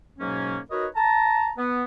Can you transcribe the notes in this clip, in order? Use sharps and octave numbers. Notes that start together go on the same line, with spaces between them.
G#2 B2 F#3 A#3 C#4
D#4 F#4 A#4 B4 C#5 D#5
A5 A#5
B3